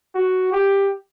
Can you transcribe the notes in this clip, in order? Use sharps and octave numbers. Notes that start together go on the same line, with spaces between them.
F#4
G4